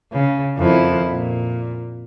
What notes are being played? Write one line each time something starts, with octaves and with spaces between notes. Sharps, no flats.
C#3
F2 D#3 E4
A#2